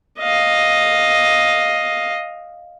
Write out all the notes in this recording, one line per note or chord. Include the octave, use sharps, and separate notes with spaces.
D#5 F5